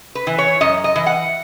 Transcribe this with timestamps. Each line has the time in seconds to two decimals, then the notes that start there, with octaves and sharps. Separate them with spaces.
0.15 B4
0.27 E3
0.38 C#5
0.61 F#2 D#5
0.84 D#5
0.96 E3
1.06 F#5